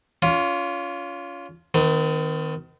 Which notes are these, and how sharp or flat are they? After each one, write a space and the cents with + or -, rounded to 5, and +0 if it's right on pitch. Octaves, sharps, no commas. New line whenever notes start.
C#4 +35 F4 +0
D#3 +5 C4 -45